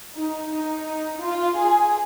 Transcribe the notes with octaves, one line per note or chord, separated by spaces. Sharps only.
D#4
D#4
F4
G#4